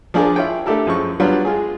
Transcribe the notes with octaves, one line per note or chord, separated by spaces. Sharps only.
F3 D4 G#4 A#4 D5
E4 F4 C#5 G5
A3 D4 E4 G4 A4 A#4
F#2 F3 G#3 C#6
F#3 G3 B3 D4 F4
G#3 F4 G#4